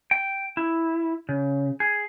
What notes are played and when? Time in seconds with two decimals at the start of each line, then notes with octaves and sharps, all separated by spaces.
0.11 G5
0.57 E4
1.29 C#3
1.80 G#4